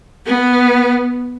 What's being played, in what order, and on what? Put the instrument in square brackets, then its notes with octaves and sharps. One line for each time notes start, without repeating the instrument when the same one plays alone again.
[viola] B3